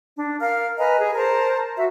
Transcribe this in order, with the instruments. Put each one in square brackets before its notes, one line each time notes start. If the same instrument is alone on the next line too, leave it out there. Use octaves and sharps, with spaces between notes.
[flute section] D4
A#4 F5 F6
B4 D#5 G#5 A#5
G#4
A#4 C5 A5 A#5
F#4 E5